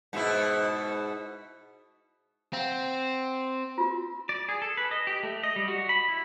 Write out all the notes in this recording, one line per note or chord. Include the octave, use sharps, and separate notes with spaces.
G#2 B2 E4
C4 F5 F#5
F4 F#4
D5
G#4
A4
B4
D#5
G4
A3
D#5
G3
F#4
B5
E4